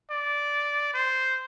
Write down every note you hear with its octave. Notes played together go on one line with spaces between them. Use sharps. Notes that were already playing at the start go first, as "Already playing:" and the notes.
D5
C5